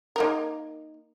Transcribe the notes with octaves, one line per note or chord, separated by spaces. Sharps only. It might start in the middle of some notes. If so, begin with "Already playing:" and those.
A#3 D#4 A#4